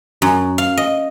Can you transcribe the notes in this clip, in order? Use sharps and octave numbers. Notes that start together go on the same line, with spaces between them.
F#2
F5
D#5